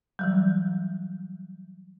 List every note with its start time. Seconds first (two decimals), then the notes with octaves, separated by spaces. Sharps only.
0.19 E3 F#3 G3